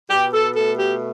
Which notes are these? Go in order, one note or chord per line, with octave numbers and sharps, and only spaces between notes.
B2 G4
A4
A3 A4
G4